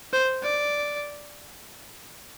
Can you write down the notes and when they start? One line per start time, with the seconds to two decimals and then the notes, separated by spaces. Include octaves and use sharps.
0.13 C5
0.43 D5